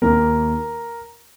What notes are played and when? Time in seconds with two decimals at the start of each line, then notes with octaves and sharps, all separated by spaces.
0.02 D#2 D#3 A#3 A#4